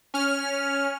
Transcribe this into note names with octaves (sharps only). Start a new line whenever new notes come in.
C#4 F6